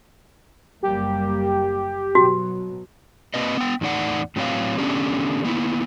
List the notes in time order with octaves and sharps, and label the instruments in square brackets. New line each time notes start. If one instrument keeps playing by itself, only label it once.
[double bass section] F#1 G3 A#3 [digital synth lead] G4
[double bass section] B2 F#3 [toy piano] F#4
[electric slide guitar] A#3 C4 B4 D#5
B3 G5
E2 A2 D#4 D5 F#5
A2 F#3 C4 B4 C#5 F5
D3 A3 B3 C#4 D4 G4
A#3 B3 E4